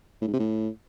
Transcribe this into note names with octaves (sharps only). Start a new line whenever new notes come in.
A2
G#2
C3
A2